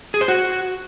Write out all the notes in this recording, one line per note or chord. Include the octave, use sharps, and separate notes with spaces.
G#4
C5
F#4